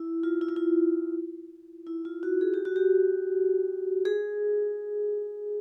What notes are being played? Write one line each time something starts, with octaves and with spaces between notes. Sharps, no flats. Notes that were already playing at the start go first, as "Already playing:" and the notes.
Already playing: E4
F4
E4
F4
E4
E4
F4
F#4
G#4
G4
F#4
G4
G#4